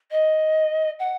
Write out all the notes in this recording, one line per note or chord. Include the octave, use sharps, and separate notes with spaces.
D#5
F#5